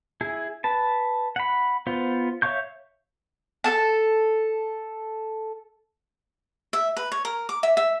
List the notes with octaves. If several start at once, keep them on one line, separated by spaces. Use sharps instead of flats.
E4 G#4
B4 A5
F#5 B5
B3 F4 C5
C#5 E5 F5 C#6 G6
A4 A5
E5
B4
C#5
A#4
D6
E5
E5